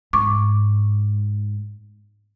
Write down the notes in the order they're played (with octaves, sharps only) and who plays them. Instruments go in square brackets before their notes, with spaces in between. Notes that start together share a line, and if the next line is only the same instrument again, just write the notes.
[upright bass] G#2 [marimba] C#6 D6